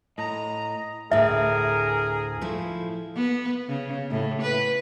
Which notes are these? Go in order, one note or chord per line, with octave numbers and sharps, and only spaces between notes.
A2 D#5 A#5
D2 A2 G#4 A#4 E5
F3 A3 E4
B3
C#3
A2
B4